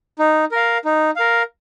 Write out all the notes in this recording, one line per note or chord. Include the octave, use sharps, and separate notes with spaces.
D#4
A#4 F5
D#4
A#4 F5